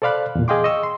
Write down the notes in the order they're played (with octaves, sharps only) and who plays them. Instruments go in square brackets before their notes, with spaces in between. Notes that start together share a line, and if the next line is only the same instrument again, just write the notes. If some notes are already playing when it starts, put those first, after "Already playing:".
[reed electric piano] A4 C5 D5 F5 B5 F#6
E2 A#2
G#4 D#5 F5 G5 C6 D6
D#5 C#6 E6
C6